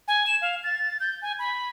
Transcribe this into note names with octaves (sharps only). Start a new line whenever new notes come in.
G#5
E7
F5
A6
G6
G#5
B5